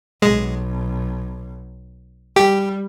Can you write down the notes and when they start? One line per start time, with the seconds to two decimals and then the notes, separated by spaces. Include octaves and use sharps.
0.22 B1 G#3
2.36 G3 G4